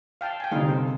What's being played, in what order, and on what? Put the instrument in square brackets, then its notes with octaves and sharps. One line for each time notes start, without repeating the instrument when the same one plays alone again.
[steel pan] F5 G5 A5
G5 G#5
[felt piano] G1 C3 [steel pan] D#4 G#4 F5
[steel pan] A4 C5